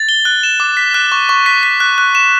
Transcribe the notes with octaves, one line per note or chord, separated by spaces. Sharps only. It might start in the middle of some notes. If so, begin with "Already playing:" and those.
Already playing: A6
G7
F#6
E7
D6
B6
F#6
C#6
C#6
B6
B6
F#6
F#6
E7